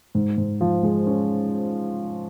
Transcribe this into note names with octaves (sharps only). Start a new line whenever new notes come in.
G#2
G#2
F3
G#3
C#4